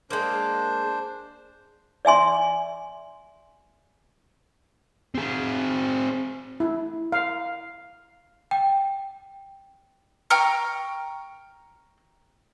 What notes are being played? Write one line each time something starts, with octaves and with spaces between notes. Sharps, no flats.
G#3 A#3 D4 C5
D5 E5 G#5 C6
C4 G#4
E4
F5
G5
G5 A#5 C#6 F6